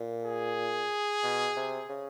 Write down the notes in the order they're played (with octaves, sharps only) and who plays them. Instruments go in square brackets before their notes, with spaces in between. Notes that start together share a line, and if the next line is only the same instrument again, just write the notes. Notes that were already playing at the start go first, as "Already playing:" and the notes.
Already playing: [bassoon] A#2
[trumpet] G#4
[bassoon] B2
C3
C#3